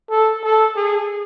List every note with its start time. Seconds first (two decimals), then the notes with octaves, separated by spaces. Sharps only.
0.10 A4
0.43 A4
0.76 G#4